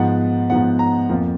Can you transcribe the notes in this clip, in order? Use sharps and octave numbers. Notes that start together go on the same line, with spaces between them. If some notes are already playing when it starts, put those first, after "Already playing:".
Already playing: G#2 F3 B3 F#5
G#2 F3 B3 F#5
A#5
F2 F3 A#3